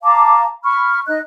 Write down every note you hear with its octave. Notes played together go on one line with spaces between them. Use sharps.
F5 A5 A#5 D6
B5 C#6 F6
D#4 D#5 F#6